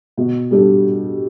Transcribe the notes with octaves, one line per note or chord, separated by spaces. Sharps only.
B2
G3 D4 A4